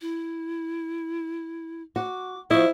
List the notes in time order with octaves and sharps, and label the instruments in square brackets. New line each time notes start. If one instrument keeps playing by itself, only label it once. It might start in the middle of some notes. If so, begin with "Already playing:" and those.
[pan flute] E4
[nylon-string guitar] F#4 [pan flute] D6
[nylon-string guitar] F3 D#5 [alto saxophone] E4 [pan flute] C#6